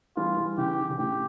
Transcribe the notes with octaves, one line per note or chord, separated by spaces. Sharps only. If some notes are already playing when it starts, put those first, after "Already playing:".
E3 G3 F4
E3 G3
C#3 E3 G4
E3
D3
A2 C#3 G4